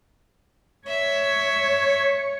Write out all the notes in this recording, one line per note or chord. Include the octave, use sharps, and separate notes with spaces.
C#5 E5